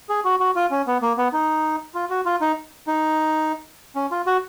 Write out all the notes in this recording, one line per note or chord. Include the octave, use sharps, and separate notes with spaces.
G#4
F#4
F#4
F4
C#4
B3
A#3
B3
D#4
F4
F#4
F4
D#4
D#4
C#4
F4
F#4